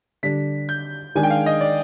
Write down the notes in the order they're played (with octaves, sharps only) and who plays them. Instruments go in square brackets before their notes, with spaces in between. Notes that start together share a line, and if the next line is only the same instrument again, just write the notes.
[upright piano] D3 G3 D4 [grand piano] B6
[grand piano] G6
[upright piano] D#3 G#3 D4 G#4 [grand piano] G#5
[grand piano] G5
F5
D#5
D5